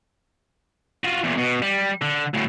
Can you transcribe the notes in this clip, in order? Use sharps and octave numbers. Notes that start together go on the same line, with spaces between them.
F4 F#4
E2 A#2
B2
G3
D3
D2 A2